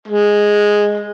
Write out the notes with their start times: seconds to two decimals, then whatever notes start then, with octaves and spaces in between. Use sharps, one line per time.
0.08 G#3